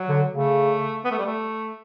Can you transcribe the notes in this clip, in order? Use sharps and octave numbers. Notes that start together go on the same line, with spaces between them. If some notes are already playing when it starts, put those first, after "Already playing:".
Already playing: F#3
D3
C#3 A3
B3
A3
G3
A3